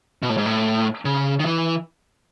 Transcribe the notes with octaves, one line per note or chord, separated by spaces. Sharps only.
B2
A2
G#2
A2
C#3
D#3
E3